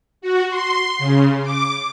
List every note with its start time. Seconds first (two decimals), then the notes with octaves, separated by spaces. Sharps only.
0.22 F#4
0.50 C6
0.99 C#3
1.43 D6